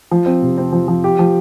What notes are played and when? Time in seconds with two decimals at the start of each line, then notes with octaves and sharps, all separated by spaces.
0.11 F3
0.26 C4
0.42 C3
0.58 C4
0.73 F3
0.88 F3
1.04 G4
1.19 F3